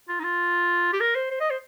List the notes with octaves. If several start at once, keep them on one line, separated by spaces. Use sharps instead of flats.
F4
D#4
F4
G4
A#4
C5
C5
D#5
C5